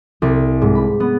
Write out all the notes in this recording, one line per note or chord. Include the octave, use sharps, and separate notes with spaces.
C2
G#2
B5
B3